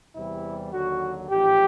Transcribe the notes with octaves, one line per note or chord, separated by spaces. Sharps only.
E2 C3 E3 G3 E4
D#2 D3 F#3 F#4
A1 G#2 F3 G4